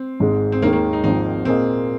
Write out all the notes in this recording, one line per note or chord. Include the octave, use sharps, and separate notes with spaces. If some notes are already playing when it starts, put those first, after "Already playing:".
Already playing: C4
G#1 G#2 G#3
C4
D#2 D#3 G#3 A#3
A#3
D#4
G#1 G#2 F3 C4 D#4
A#2 A#3 C4 G#4 D#5